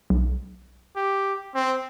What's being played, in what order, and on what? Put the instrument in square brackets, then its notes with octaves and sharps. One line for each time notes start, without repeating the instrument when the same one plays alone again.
[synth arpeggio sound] B1
[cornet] G4
C4